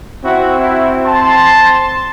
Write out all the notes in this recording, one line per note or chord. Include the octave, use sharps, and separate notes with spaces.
C4 E4 F#4
E4 F#4
A5 C6